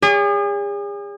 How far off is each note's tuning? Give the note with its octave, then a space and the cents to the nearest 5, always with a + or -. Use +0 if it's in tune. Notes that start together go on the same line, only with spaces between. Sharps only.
G#4 -40 C#5 +45